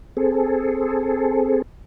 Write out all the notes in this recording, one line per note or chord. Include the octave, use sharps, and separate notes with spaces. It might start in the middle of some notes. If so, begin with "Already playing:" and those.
C4 G#4 A4